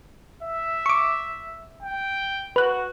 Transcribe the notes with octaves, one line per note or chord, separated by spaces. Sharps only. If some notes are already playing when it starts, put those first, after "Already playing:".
E5
C#6 D6
G5
F#4 B4 F#6